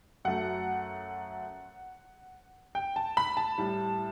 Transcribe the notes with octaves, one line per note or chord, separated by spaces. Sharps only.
F#2 F#3 A3 F#5
G5
A5
B5
A5
A2 G3